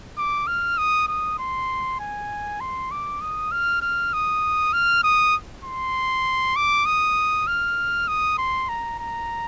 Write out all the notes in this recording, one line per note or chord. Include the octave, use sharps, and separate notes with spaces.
D6
F6
D#6
D#6
C6
G#5
C6
D6
D#6
F6
F6
D#6
F6
D#6
C6
D6
D#6
F6
D#6
C6
A#5
A#5